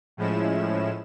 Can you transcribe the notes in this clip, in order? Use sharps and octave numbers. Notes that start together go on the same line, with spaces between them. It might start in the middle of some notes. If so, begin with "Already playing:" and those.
A2 F3 G#3 C#4 E4 E7